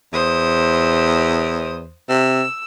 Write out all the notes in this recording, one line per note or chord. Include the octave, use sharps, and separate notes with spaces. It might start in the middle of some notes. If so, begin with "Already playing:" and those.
E2 C5 D#6
C3 E6